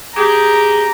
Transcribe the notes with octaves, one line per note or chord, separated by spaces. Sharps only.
G4 G#4 A#5